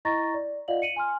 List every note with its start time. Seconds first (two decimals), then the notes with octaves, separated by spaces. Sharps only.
0.05 E4 D#5 A#5 C#6 A6 A#6
0.34 D5
0.68 F4 D5 D#5 F5 F#5 F#7
0.82 C#7 D#7 F#7
0.96 G#5 C6 F6